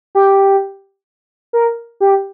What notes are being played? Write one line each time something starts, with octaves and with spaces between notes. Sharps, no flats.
G4
A#4
G4